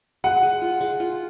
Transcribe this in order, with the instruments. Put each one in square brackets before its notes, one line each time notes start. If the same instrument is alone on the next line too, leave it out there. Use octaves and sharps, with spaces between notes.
[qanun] G#3 [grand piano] F#5
[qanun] G#3
F4
G#3
F4